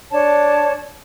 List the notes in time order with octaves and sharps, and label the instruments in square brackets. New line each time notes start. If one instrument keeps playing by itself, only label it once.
[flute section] D4 C#5 A5